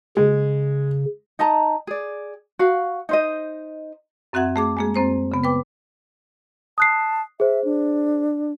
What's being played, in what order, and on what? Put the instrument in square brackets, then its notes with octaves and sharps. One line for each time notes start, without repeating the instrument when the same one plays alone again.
[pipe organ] C#3 [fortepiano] G#3
[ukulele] D#4 D#5 A5 A#5
G#4 D5
F#4 F5
D#4 C5 D#5
[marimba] F#2 C4 F#4 E5 F#5 G#6
A3 G#4 D6
G#3 A#3 G#4
F#2 C4 C5 A#5
C#3 B3
B4 G5 D6
[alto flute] A5 [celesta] D#6 F#6 C7
[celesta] G#4 C5 [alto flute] E5
[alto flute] D4